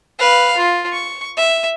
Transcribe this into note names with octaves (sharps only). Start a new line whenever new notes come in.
B4 F5
F4
C#6
E5